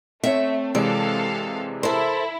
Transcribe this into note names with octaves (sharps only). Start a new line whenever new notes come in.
A3 C4 C#5 E5
C3 E3 G#3 A4 D5 F5
E4 A4 A#4 C5